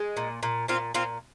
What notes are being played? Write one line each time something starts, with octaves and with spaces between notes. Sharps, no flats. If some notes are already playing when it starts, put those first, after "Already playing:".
Already playing: G#3
A#2
A#2
A#2 C4 F4
A#2 C4 F4